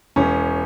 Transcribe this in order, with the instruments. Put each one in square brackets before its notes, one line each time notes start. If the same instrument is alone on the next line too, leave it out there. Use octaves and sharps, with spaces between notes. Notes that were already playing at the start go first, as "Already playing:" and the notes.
[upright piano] E1 C#4